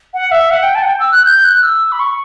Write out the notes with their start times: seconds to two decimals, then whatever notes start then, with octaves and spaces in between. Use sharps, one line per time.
0.13 F#5
0.31 E5
0.50 F#5
0.62 G5
0.75 A5
0.82 F#5
0.87 G5
0.99 E6
1.12 F#6
1.25 G6
1.44 F#6
1.62 E6
1.92 B5
1.99 C#6